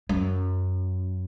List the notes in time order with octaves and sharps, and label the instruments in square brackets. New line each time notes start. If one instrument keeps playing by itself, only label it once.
[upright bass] F#2